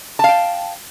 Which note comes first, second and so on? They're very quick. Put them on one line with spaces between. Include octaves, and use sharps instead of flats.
A5 F5 G5